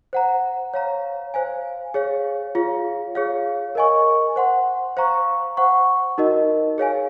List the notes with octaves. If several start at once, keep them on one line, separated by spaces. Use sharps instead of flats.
C5 F#5 A#5
C#5 F5 A#5
C5 F5 G#5
G#4 C#5 F5
F4 G#4 C#5 F5
G#4 C#5 F5
A#4 D#5 G#5 C#6
C5 F#5 C6
C5 F5 A#5 C#6
C5 F#5 C#6
D#4 F#4 A#4 D#5
G#4 C#5 F5 G#5